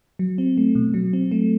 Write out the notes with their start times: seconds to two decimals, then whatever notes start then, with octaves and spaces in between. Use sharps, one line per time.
0.19 F#3
0.38 C4
0.57 A3
0.75 B2
0.94 F#3
1.13 C4
1.31 A3